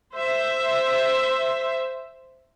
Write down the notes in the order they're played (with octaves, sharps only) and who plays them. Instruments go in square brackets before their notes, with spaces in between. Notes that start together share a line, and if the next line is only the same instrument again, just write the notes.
[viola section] C5 E5